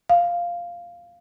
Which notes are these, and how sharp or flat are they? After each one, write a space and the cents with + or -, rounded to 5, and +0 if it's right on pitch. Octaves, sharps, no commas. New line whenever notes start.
F5 -5